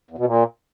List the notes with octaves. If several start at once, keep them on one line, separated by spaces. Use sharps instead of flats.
E2
B2
A#2